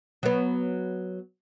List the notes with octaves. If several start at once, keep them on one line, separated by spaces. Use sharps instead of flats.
F#3 B3